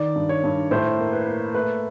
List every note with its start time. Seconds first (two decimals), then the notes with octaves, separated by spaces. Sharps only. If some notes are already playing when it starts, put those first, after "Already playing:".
Already playing: D#3 D5
0.16 G2
0.29 C#5
0.44 G2
0.71 A2 C5
0.99 A#3
1.13 B4
1.27 A#3
1.55 A3 B4